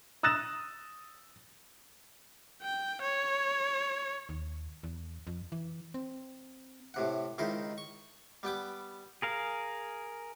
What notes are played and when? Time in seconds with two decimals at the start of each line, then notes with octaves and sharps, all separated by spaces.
0.23 D#6 E6 F#6 A6 A#6 E7
2.62 G5
3.01 C#5
4.29 D#2
4.83 E2
5.27 F2
5.52 E3
5.94 C4
6.94 A2 C3 F#5
7.38 C#2 D#3 D#4 E4 C5
7.78 C#6
8.43 G3 B3 G5 D6
9.22 G#4 A#4 F5